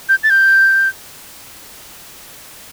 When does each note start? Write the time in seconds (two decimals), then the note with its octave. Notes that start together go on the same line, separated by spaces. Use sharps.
0.09 G6
0.23 A6
0.30 G6